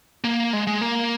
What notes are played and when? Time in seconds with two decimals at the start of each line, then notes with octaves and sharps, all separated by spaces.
0.24 A#3
0.53 G#3
0.67 G#3
0.81 A#3